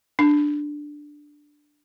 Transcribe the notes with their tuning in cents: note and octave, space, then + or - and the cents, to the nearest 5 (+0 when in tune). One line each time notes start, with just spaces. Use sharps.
D4 +5